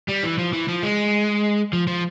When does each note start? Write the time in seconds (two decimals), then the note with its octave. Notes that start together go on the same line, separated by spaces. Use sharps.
0.09 G3
0.24 E3
0.39 F3
0.54 E3
0.69 F3
0.83 G#3
1.73 F3
1.87 F3